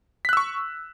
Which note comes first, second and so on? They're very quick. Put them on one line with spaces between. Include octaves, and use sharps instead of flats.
B6 F#6 E6 C#6